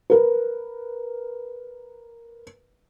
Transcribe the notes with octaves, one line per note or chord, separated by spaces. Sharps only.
A#4 B4